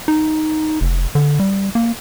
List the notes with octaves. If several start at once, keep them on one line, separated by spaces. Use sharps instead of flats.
D#4
F1
D3
G3
A#3